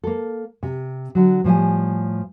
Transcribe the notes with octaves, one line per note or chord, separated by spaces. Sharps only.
A#3 A4
C3
D3 F#3
A2 F3 G3 G#5